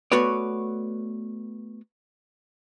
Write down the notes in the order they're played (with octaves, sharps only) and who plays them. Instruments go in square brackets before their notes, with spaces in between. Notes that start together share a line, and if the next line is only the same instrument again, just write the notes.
[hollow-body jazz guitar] A3 B3 F#4 B4 C#5 D5